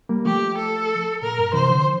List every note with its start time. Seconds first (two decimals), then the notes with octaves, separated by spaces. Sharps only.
0.09 G3 A#3
0.25 F3 A3 G4
0.58 A4
1.22 A#2 A#4
1.38 G2
1.53 C3 E3 C5
1.69 D3 F3